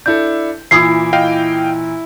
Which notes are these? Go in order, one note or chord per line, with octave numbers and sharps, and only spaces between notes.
D4 E4 A4 G6
A#2 E3 E4 D6 D#6 C7
D#5 F5 G5